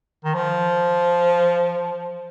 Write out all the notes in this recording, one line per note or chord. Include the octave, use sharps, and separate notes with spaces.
D#3
F3